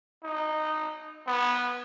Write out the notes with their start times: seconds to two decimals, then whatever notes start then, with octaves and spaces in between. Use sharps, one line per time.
0.24 D#4
1.27 B3